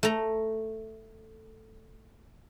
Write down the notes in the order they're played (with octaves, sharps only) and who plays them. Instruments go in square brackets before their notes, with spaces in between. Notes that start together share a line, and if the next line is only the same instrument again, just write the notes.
[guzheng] A3 A#5